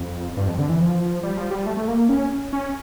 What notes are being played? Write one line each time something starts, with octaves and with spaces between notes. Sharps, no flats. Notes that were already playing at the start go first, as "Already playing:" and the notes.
Already playing: F2
G2
F2
D3
E3
F3
G3
F3
G3
A3
A3
A#3
C#4
C#4